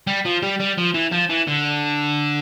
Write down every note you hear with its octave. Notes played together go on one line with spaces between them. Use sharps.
G3
F3
G3
G3
F3
E3
F3
E3
D3